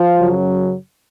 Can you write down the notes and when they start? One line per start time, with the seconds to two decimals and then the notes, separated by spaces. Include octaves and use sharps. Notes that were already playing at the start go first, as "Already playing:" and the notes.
Already playing: F3 F4
0.17 F#2 C#3 F#3